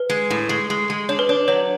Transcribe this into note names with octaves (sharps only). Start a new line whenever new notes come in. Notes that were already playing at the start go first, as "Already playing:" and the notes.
Already playing: B4
G#3
A2
G#3
G#3
G#3
D4 C#5
B4
D4 C#5
F#3 C#5